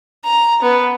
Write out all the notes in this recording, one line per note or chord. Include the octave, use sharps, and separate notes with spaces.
A#5
B3